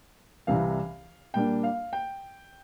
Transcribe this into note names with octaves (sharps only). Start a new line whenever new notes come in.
C2 C3 E3 G3 F5
A#2 G3 A#3 D4 G5
F5
G5